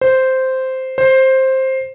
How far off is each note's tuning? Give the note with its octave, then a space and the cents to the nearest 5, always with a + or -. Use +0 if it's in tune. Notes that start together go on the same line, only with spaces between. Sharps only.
C5 -5
C5 +10